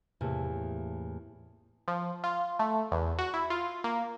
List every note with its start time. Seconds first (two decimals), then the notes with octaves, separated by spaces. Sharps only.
0.21 E2 A2 C3 A3 A#3
1.88 F3
2.24 F4
2.59 A3
2.92 E2
3.18 F#4
3.34 E4
3.50 F4
3.84 A#3